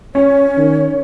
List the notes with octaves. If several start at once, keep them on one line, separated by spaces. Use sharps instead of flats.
C#4 C#5
D#3